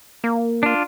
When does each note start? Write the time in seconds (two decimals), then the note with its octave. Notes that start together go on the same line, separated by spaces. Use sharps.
0.24 A#3
0.63 D4 F4